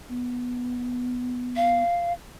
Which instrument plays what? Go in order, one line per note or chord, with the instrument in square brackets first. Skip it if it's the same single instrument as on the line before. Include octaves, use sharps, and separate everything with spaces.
[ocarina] B3
[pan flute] F5